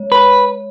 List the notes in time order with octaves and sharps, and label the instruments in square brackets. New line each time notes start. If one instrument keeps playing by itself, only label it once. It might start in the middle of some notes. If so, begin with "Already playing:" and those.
Already playing: [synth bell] G#3 C#5
[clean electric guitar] B4